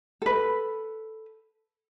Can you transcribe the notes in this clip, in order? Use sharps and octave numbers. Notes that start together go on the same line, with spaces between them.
A4 B4